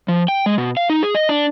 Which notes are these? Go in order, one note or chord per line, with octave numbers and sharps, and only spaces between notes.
F3
G5
G#3
B2
F5
D#4
G#4
D#5
D4